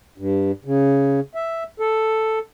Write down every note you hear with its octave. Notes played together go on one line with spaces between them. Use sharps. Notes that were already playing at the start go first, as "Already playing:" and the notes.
G2
C#3
E5
A4